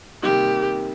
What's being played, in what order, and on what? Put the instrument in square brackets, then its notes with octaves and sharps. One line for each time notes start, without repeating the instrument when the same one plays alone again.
[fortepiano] C3 D#3 G3 A#3 [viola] G4